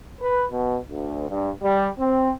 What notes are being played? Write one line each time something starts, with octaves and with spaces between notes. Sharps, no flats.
B4
B2
D2
G2
G3
C4